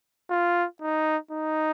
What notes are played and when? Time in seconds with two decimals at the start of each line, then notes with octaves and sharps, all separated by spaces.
0.30 F4
0.82 D#4
1.31 D#4